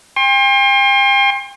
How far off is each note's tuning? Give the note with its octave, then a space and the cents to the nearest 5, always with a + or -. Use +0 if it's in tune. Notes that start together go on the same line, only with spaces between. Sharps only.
G5 +40 C6 +35